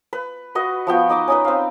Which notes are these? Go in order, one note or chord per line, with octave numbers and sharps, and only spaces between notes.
B4
F#4 B4 D#5
F3 B3 G5 C#6
D#4 D#5 D6 D#6
C#4 D#4 B4
C4 F5